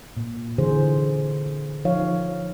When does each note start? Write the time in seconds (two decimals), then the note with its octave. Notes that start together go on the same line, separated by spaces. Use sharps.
0.17 A#2
0.58 D3 E3 G#4 C5
1.85 F3 D#4 C#5 F5